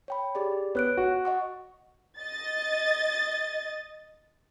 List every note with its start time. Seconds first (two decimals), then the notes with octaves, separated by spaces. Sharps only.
0.08 C#5 G5 B5
0.35 G4 G#4 D5
0.75 B3 C#5 F#6 D7
0.97 F#4
1.25 D#5 F#5 C#6
2.19 D#5 A6